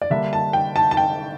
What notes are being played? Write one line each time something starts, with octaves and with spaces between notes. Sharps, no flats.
D5
D3 G3 A#3 D4 E5
A5
G5
A5
A5
G5